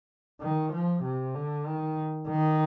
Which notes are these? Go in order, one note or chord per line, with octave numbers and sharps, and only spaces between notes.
D#3
F3
C3
D3
D#3
D#3